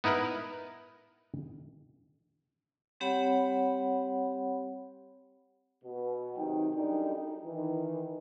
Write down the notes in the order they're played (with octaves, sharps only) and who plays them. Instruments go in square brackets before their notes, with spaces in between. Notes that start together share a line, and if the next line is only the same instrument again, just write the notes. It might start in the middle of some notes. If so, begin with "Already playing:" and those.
[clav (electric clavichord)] B3 D#4 E4 A#4 B4
[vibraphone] G3 C4 G4 C#5 F#5 B5
[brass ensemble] B2
C3 D#3 F#3 D#4 G5
F#2 G3 D4 D#4 A4 G5
D#4
D#3 E3